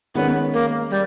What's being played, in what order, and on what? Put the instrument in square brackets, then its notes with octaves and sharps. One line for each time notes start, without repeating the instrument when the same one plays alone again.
[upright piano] D#3 G#3 C#4 [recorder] B3
[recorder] A#3
G3